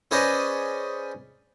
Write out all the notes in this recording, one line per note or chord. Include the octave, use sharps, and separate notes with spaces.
C#4 G#4 B4 C5 D5 D#5